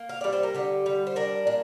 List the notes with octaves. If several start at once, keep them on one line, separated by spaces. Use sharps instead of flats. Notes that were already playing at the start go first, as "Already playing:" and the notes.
Already playing: A#3
F5
G3 D5
C5
A#4
D3 G4
G3
C5
D4 A#4
A#2